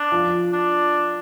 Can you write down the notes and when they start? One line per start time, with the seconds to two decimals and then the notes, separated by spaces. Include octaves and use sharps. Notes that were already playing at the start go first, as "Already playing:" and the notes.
Already playing: D4
0.12 F3
0.53 D4